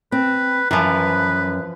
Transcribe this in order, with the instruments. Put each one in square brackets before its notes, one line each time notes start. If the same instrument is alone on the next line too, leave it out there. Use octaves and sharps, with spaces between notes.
[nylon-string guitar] C4 [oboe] B4
[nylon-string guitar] F#2 [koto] E3 F3 [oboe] B4